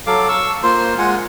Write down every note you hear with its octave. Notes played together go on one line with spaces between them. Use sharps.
F#3 A4 F5 D6
C#6 E6
A#3 F4 C5 C6
G#3 F4 F#5 G#5